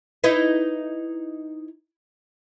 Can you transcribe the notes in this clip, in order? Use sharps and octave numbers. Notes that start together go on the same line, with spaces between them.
D#4 E4 B4